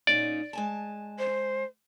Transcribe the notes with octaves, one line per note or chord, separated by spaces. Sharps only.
A#2 C#4 D#4 D5
G#3 G#5 A5
C5